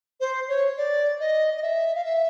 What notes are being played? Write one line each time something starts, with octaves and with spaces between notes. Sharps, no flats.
C5
C#5
D5
D#5
D#5
E5
F5
E5